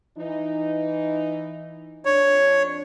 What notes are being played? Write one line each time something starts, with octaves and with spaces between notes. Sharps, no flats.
E3 D#4
F2 D4 C#5